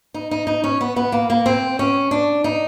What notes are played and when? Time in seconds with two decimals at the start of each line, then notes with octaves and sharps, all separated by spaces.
0.14 D#4
0.31 D#4
0.47 D#4
0.64 C#4
0.81 B3
0.96 B3
1.12 A#3
1.30 A#3
1.46 C4
1.79 C#4
2.11 D4
2.44 D#4